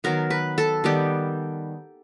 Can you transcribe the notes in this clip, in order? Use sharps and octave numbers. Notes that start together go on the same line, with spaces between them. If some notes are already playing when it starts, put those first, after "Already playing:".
D#3 F#3 B3 A#4
B4
A4
D#3 G3 B3 G4